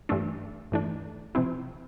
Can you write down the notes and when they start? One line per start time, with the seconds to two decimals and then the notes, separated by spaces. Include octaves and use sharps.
0.09 G2 E3 A3 D4
0.72 G2 E3 A3 D4
1.35 C3 F3 C4 E4